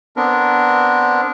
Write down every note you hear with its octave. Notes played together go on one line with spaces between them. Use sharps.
B3 C4 D4 A#4